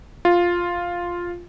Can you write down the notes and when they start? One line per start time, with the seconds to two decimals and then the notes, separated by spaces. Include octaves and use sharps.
0.25 F4